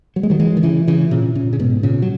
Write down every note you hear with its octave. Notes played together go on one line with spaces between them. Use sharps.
F#3
G#3
D#3 F#3
E3 G#3
D#3
C#3 E3
C#3 E3
A#2 C#3
A#2 C#3
C#3
G#2 B2
A#2 C#3
F#3